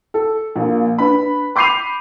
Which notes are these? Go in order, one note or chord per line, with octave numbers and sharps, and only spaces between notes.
A4
A#1 A#3 F4
D4 B4 B5
B5 D6 G6 C7 D#7 F7